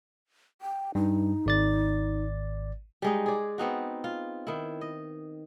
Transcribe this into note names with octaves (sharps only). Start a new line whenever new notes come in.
G5
G2 D#4
G#1 D5 A6
G3 G#3 D#4
G#4 D5
B3 C4 D#4 F#4
F4
D#3 E4
D#5